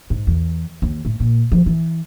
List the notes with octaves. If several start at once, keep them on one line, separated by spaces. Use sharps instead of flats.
G#2
E2
D#2
A2
A#2
F3
E3